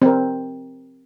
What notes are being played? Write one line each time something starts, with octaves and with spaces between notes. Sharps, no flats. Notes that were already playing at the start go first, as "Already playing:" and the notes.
C4 A#4